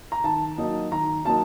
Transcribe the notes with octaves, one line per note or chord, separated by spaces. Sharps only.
A#5
D#3 A5
F#3 A#3 D#4
D#3 A#5
F#3 A#3 D#4 A5